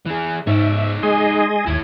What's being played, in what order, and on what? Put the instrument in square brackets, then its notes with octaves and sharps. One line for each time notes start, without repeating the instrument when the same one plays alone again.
[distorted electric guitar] E3 G#4
[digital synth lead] G#2 [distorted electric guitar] D#4 C#5 [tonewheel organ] E5
[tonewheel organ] G#3 G#4 D#5 [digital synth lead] G#5
[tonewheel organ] D#2 [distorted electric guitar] E4 C#5 [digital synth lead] G#6